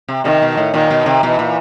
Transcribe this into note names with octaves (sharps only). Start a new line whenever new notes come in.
C3
C3 D#3
B2
A2
A#2 D#3
B2
C3
B2 E3
A#2